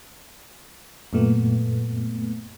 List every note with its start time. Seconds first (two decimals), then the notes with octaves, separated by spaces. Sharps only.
1.13 F#2 A#2 A3 B3